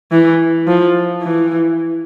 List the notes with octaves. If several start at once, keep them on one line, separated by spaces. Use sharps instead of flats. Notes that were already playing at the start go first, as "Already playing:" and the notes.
E3
F3
E3